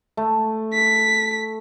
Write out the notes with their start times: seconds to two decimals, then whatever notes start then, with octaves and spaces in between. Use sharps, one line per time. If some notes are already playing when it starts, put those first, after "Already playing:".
0.17 A3
0.74 B6